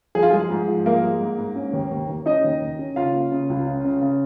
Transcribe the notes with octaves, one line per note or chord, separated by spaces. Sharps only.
F3 G#4
F4
G#3 G#4
G#2
F3
G#3 A#3 A#4
G#3
G#2
G#2
C#4
D#2
D#2
D#2
C#4 D#4 D#5
D#2
D#2
C#4
C#3 F4 F5
A#3
C#3
C#2
C#3
C#3
C#3